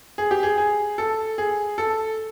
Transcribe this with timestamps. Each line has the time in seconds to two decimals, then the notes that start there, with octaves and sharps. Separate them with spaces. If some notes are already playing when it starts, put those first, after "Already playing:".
0.18 G#4
0.31 G4
0.43 G#4
0.58 G#4
0.98 A4
1.38 G#4
1.78 A4